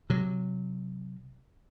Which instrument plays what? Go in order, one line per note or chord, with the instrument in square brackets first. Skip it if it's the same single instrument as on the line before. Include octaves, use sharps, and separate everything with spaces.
[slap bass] C3 F#3